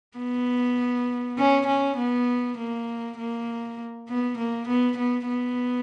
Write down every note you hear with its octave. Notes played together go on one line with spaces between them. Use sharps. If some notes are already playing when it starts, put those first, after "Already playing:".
B3
C#4
C#4
B3
A#3
A#3
B3
A#3
B3
B3
B3